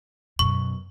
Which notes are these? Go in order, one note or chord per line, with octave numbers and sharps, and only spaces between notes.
F#2 B2 C#6